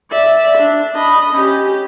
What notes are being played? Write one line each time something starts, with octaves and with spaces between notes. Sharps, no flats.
D5 E5
D4
D#5 B5
C#4 G4